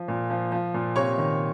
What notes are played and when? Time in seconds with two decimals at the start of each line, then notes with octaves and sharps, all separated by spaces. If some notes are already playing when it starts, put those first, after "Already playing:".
Already playing: F3
0.08 A#2
0.30 F3
0.52 F3
0.74 A#2
0.96 C3 C#5 C#6
1.18 D#3